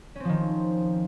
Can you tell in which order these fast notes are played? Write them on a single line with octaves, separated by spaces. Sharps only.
C#4 C4 F3 D#3